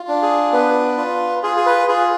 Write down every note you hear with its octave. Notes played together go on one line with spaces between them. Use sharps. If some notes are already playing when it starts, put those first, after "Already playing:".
Already playing: F4
D4
G#4
B3 B4
F4
F4 G#4
G#4
B4
F4 G#4